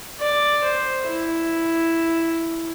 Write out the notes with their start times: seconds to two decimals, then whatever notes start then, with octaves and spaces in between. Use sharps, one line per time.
0.20 D5
0.64 C5
1.07 E4